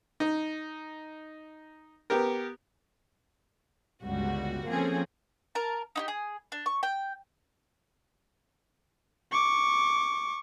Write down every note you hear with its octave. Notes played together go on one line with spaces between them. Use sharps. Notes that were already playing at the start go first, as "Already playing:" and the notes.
D#4
B3 G4 A#4
G1 C#2 G3 F#4
F3 A#3 C4 C#4 G#4 A4
A#4 A5
D#4 E4 G4
G#4
D4
C#6
G5
C#6 D6